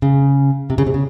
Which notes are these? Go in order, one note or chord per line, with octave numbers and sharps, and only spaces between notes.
C#3
C3
C#3
C3
C#3